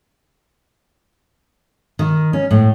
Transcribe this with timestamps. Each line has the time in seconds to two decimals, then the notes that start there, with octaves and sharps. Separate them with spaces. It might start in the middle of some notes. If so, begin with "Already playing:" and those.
1.99 D#3
2.33 C#4
2.51 A2